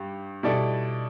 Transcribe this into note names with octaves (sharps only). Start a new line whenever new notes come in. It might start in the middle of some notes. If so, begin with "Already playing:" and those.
Already playing: G2 G4
B2 G3 E4 A4 D5